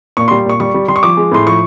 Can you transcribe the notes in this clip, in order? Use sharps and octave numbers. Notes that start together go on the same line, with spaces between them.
A#2 C#6
C6
G3
A#2 C#6
G3 C#6
G3
G3 C6
C#6
F3 D6
G#3
A2 C6
F3 C#6